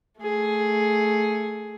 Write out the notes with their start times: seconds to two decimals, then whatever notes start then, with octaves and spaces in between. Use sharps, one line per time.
0.21 A3 G#4